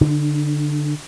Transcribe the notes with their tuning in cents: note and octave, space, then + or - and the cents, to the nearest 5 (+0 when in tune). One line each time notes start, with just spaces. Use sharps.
D3 +0 D4 +45